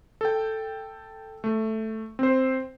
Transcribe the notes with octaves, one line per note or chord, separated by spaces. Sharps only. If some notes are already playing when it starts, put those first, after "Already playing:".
A4 G5
A3
C4 C5